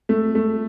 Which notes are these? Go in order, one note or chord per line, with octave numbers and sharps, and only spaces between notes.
A3
A3